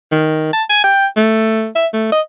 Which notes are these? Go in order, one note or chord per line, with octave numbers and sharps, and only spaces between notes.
D#3
A5
G#5
G5
A3
E5
A3
D#5